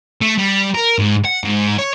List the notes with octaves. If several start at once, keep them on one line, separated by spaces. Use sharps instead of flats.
A3
G3
A#4
G#2
F#5
G#2
C#5